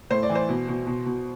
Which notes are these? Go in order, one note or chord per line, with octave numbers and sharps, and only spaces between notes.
A2 C5
D5
E3
C5
B2
B2
B2
B2